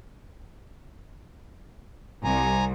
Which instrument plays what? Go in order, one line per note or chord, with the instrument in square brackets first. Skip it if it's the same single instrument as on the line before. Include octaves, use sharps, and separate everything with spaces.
[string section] C2 [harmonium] G#5 A#5